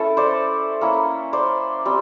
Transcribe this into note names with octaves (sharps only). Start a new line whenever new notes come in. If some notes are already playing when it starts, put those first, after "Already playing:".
Already playing: A3 C#4 E4 A4
C5 D5
A#3 C#4 E4
C5 D5
G3 C4